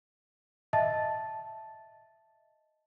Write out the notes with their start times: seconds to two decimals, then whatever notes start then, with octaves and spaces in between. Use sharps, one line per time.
0.73 D#5 E5 A5 A6